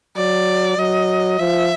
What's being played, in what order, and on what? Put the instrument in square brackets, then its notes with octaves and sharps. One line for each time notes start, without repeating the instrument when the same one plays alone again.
[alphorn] F#3 [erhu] D5
[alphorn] F#3 [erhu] D#5
[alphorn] F3 [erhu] E5